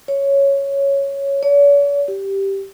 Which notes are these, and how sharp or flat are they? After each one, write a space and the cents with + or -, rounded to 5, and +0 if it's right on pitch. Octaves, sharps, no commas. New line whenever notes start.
C#5 +0
C#5 +45
G4 -5